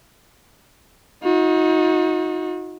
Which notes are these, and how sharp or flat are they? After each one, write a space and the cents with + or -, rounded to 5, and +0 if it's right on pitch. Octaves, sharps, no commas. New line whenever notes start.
D#4 +25 F#4 -35